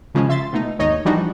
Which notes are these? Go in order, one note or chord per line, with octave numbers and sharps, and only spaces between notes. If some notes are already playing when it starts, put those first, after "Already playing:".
C#3 F3 G#3 C#4 G#4
E5 C6 A6
B2 A3 D#4
G#1 D#2 D#4 C#5 D#5
E3 F3 G3 D4 D#4 F#4